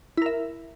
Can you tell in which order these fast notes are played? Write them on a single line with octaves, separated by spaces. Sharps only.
E4 A#4 E5